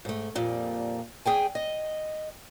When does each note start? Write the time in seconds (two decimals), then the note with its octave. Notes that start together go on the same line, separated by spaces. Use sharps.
0.05 G#2 A3
0.35 F2 A#2 G3
1.26 E2 G#4 G5 G#5
1.55 D#5